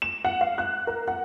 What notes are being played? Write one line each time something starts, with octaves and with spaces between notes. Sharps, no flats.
E7
F#5
F5
F#6
A#4
F#5